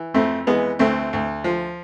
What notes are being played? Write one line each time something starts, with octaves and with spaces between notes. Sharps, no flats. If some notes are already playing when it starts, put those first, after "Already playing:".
Already playing: E3
F2 A3 C4
E3 G#3 B3
D2 A3 C4
D2
F3